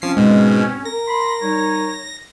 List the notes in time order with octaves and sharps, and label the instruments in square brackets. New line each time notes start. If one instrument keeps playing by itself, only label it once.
[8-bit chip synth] F3 C7 [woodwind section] C4 C#4
[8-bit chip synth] G#2 B2 [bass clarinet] G#3
[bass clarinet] A#4 [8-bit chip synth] A#6
[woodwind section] B5 C6
G3 D#4 C#5